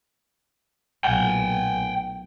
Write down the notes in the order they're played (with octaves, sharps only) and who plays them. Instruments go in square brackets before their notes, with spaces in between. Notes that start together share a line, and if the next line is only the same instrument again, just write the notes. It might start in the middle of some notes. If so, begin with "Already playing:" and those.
[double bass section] B1 A#2 A3 [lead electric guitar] F#5 G5